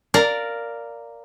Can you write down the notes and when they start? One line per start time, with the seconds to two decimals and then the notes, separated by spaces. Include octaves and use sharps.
0.14 A#4 D5 F5 A#5